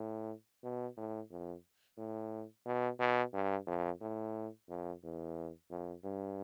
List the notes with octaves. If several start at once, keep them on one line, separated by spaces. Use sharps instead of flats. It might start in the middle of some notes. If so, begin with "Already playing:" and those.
Already playing: A2
B2
A2
F2
A2
B2
B2
G2
F2
A2
F2
E2
F2
G2